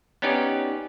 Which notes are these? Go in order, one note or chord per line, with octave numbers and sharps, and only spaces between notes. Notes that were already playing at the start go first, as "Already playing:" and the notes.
B3 C#4 D#4 G4 D5